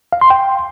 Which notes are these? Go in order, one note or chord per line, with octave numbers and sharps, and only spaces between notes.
F5
C6
G5